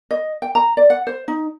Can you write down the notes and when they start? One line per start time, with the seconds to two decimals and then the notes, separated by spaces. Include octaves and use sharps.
0.11 D#5
0.42 G5
0.55 A#5
0.77 D5
0.90 F#5
1.07 C5
1.28 D#4